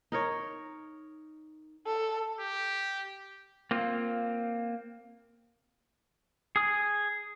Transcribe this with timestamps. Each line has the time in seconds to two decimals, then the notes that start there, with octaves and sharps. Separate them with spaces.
0.12 D#4 A#4 C#5
1.87 A4
2.40 G4
3.71 A#3 C4 F4
6.56 G#4 D#6